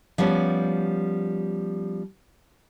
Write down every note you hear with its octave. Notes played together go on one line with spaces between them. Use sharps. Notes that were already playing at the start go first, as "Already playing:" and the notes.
F3 G3 B3 C#4